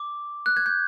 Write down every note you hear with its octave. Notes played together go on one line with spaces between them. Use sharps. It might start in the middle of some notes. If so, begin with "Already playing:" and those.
Already playing: D6
F#6
G#6
G6